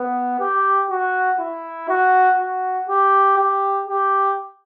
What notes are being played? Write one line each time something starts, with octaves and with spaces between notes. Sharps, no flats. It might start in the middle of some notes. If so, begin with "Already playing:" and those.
Already playing: B3
G4
F#4
E4
F#4
F#4
G4
G4
G4